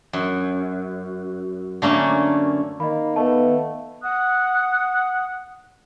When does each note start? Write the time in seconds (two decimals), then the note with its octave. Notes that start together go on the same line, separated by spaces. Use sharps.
0.13 F#2
1.82 D3 A3 A#3 C#4
2.80 D#3 A#3 D#5 B5
3.16 A3 B3 D#5 F5 A5
4.02 F#5 D#6 F#6